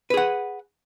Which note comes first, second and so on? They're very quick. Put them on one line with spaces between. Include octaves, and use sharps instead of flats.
B4 G#4 F#5